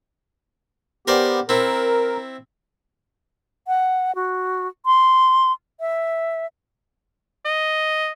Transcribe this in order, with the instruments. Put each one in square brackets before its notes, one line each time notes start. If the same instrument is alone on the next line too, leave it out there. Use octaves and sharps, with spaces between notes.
[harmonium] B3 G4 [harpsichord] A#4 C5 D5
[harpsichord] C4 E4 [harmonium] A#4
[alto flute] F#5
F#4
C6
E5
[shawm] D#5